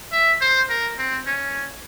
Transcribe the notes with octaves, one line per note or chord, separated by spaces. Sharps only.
E5
C5
A#4
C4
C#4